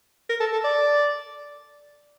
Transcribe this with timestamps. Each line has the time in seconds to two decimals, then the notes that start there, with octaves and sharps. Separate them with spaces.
0.30 A#4
0.40 A4
0.53 A4
0.64 D5